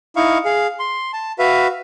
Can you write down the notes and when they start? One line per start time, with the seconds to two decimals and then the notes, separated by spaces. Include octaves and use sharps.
0.16 D#4 E4 F5 C#6
0.45 G#4 F5
0.79 C6
1.13 A5
1.39 F#4 B4 E5 F5